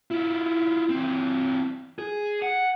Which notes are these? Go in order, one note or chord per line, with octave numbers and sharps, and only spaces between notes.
E4 F4
E3 C4
G#4
F#5